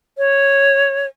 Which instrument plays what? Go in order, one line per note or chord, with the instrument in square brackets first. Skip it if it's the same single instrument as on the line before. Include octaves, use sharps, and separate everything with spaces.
[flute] C#5